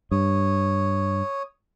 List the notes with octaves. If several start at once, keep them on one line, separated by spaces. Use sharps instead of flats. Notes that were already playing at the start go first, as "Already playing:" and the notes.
G2 C#5 D#6